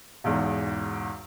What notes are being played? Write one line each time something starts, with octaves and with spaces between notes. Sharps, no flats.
B1 E2 G#2